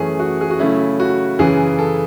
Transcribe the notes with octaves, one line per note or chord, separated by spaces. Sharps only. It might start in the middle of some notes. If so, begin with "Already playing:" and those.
Already playing: F#2 E3 A3 C#4 G#4
F#4
G#4
F#4
C#3 F#3 A3 C#4 E4
F#4
F#2 C#3 E3 G#4
A4